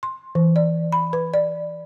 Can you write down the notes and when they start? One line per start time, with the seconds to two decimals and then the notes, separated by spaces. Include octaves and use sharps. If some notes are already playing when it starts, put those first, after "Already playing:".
0.03 C6
0.35 E3
0.56 D5
0.92 B5
1.13 B4
1.34 D5